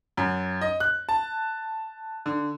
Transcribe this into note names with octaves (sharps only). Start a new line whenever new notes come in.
F#2
D#5
F#6
A5
D3